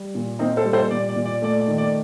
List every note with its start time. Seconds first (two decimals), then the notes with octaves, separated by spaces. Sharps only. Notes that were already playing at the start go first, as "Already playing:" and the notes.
Already playing: G3
0.15 A#2
0.39 A#3 C4 D#4
0.57 A4 C5
0.65 G3
0.73 A4 C5
0.91 A#2 D5
1.09 D5
1.16 A#2
1.26 D5
1.42 A3 D5
1.61 D5
1.67 D#3
1.78 D5